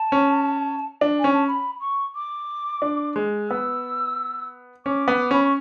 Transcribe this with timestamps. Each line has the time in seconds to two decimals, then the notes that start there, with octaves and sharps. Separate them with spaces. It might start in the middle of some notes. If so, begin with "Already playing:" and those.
Already playing: A5
0.12 C#4
1.01 D4
1.20 C#4 G#5
1.33 A5
1.48 B5
1.81 C#6
2.15 D6
2.82 D4
3.16 G#3
3.50 B3 E6
4.85 C#4 D6
5.08 B3
5.31 C#4 B5
5.43 C#6